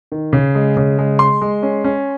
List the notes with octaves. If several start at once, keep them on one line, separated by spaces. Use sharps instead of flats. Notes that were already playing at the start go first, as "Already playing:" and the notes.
D#3
C#3
G#3
C#3
G#3
G#3 C6
G#3
C#4
C#4